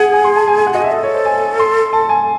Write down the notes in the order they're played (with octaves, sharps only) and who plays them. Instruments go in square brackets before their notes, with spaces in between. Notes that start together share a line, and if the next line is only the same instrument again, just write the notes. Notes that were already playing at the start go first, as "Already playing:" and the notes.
Already playing: [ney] G#4 [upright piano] F#5 G#5
[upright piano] G#5
C6
A5
G#5
G#5
F#5
[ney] F#4 [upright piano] D#5
[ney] G#4 [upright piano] E5
[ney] A4 [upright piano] D#5
[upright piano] C#5
C5
G#5
C6
A5
G#5